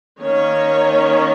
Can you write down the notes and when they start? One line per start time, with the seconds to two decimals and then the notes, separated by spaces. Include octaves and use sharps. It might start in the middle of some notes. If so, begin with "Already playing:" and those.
0.20 D#3 A#3 C#4 C#5